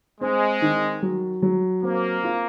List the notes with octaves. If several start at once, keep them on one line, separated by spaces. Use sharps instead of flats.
G#3 C4
D#3
F#3
F#3
A#3 C4
F4